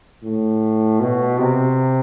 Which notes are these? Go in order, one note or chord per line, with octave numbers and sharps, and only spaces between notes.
A2
B2
C3